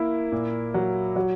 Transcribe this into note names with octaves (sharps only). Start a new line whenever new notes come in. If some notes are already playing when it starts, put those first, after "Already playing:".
Already playing: A#3 E4
A#2
F#3
F#3